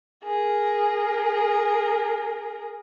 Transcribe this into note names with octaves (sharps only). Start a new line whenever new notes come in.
G#4 A#4